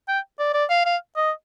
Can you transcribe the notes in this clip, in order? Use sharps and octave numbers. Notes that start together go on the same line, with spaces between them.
G5
D5
D5
F5
F5
D#5